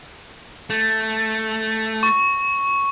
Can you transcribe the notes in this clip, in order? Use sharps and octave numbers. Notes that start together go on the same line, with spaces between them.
A3
C#6